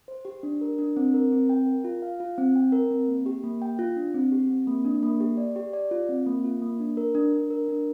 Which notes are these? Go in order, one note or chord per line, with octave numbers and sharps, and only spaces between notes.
C5
G4
D4
A#4
D4
C4
A#4
C4
G5
A#4
F4
F5
F4
C4
G5
A#4
C4
A#3
G4
A#3
G5
F4
D4
C4
G4
C4
A#3
D4
A#3
G4
D5
G4
D5
F4
C4
A#3
F4
A#3
D4
A#4
D4
D4
A#4
D4